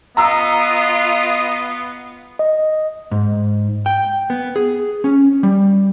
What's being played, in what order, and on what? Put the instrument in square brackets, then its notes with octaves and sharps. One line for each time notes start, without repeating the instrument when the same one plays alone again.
[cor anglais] B3 [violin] F4 [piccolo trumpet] D#5 [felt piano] A#5 E6
[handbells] D#5
[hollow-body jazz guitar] G#2
G5
B3
G#4
C#4
G3